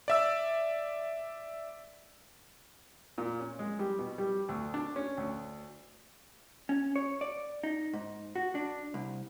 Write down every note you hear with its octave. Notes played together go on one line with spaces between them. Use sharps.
D5 E5 E6
A#2
C#4
G#3
G3
B2
G3
D2
D4
C#4
D2
C#4
C#5
D5
D#4
G#2
F#4
D4
C2